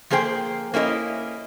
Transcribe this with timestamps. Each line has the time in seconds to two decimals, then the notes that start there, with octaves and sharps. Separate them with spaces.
0.10 F3 A#3 G#4 C5 G5
0.74 A#3 C#4 E4 A4 D#5